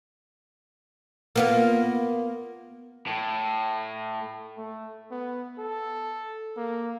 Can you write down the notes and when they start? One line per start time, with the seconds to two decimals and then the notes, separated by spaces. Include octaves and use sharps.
1.36 A#3 B3 F4
3.07 A2
4.58 A3
5.11 B3
5.59 A4
6.57 A#3